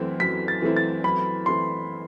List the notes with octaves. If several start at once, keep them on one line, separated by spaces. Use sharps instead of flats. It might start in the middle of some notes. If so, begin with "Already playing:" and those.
Already playing: F#2 E3 A3 C4 E4
F#2 B6
A6
E3 A3 C4 E4
A6
F#2 B5
E3 A3 C4 E4 C6